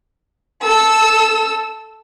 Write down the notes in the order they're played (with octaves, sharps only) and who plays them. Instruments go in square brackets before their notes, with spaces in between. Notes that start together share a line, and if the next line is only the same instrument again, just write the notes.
[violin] A4 E6